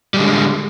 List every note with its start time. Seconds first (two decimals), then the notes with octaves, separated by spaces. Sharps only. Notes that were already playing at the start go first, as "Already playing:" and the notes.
0.14 G3
0.17 G#3
0.19 D3